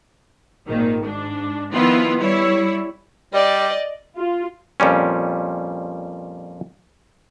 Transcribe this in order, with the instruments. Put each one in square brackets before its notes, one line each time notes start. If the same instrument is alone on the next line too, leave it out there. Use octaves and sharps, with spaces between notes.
[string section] G#1 A#2 D#3
G#2 D4
D#3 F3 B3 E4 F4
G3 E4 C#5
[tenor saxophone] G3 [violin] D5 D#5
[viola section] F4
[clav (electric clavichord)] F2 A#2 G3 C#4